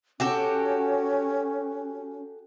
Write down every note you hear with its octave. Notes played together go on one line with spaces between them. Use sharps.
C#4 F#4 G4 A4